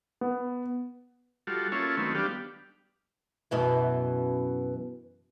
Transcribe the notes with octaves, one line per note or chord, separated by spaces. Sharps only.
B3
G3 F4 F#4 A4
A#3 C#4 E4 F4 A4 C#5
D#3 F#3 A3 B3 C4
G3 B3 D4 G4 F5
F#2 B2 E3